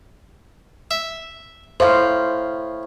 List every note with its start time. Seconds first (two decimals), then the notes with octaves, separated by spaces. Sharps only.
0.91 E5
1.80 A2 C5 F5